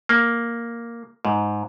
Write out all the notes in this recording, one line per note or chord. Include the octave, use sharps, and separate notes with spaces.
A#3
G#2